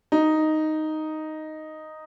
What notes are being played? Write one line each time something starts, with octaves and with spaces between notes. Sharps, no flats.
D#4